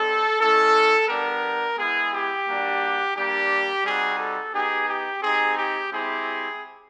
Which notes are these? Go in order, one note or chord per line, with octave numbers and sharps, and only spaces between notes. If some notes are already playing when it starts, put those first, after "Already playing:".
Already playing: G3 C4 D#4 A4
G#3 C#4 E4 A4
G3 B3 D4 G4 A#4
G#3 B3 E4 G#4
G4
G3 A#3 D4 F#4
G3 A#3 D4 G4
G3 C4 D#4 F#4 G#4
A4
B3 D#4 G4 G#4
G4
C4 D#4 G4 G#4
G4
G#3 C4 E4 G4 G#4